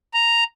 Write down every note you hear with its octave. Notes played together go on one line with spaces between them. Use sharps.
A#5